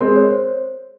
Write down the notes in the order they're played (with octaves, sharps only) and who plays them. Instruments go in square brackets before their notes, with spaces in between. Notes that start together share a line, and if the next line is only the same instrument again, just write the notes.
[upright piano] G#3 C4 [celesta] A#4
[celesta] C#5
C5